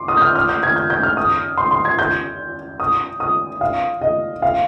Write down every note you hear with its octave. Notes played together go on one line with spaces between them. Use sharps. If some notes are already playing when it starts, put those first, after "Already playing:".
Already playing: C6 D6
D#6
G6
F6
F6
G6
G#6
G6
G6
F6
D#6
C6
C6
G#6
G6
D#6
D#6
F5
D#5
F5